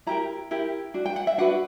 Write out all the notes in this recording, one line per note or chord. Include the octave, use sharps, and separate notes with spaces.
E4 G4 A#4 A#5
E4 G4 A#4
D4 F#4
G5
F#5
E5
D4 F#4 B4 F#5